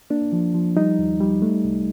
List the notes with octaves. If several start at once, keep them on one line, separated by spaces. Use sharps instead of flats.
A#3 D4
F3
F3
G3 D#4
D#2
G3
A3
C2